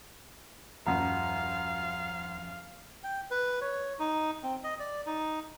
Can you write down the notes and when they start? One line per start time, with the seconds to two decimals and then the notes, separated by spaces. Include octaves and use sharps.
0.87 D#1 F#2 F3 F5 F#5 A#5
3.04 G5
3.31 B4
3.61 C#5
3.99 D#4
4.43 C4
4.64 D#5
4.80 D5
5.07 D#4